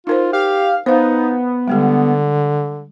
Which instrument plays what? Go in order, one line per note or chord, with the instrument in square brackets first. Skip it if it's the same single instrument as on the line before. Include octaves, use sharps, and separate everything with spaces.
[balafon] D#4 A#4 C5 [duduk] F4
[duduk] G4 [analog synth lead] F5
[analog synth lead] B3 [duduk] D#4 [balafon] C5 F5
[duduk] D3 [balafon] G3 G#3 G4